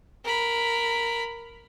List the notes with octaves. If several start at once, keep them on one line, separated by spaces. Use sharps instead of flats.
A#4 B5